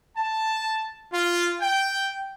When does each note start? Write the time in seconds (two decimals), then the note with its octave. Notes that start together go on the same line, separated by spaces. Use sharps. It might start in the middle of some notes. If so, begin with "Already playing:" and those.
0.16 A5
1.12 F4
1.61 G5